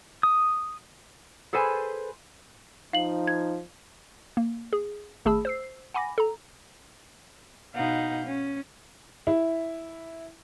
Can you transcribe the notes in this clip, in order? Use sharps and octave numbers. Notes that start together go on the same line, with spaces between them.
D#6
G#4 A4 B4 C5 G#5
F3 D#4 F5 F#7
G#6
A#3
G#4
G#1 A3 G#4 A5 B5 E6
C5 E6 C7
F#5 G#5 B5 D6 A#6
A4 A#5
B2 D#4 F5 F#5 G6
C#4
E4